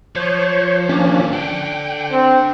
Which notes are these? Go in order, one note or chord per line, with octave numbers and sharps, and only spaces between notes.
F3 C5 C#5
F3 G3 A#3 C#4 D4
D3 D4 G5
C4